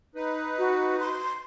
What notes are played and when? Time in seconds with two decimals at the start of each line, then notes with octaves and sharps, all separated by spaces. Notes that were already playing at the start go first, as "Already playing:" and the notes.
0.15 D#4 B4
0.59 F#4
1.00 C6